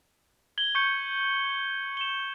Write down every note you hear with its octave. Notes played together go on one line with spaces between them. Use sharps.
G#6 F#7 G7
C#6 G6 C#7
E7 G7